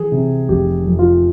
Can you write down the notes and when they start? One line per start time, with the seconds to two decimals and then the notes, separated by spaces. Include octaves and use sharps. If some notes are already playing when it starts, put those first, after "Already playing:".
Already playing: E3 G#4
0.12 C3
0.49 F1 G4
0.86 F2
0.99 F4